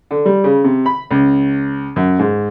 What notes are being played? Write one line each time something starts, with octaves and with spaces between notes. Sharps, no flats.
D3
G3
C#3
C3
B5
C#2
F#2
G#2